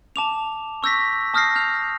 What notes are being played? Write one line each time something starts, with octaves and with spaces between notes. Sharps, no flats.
A5 D6 F7
C#6 E6 G6 A#6 B6
A5 D#6 F6 G6 A#6 C7
F6 G6 F7